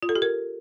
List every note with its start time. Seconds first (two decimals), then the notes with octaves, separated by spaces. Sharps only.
0.02 F4
0.09 A4
0.15 G4
0.22 A#4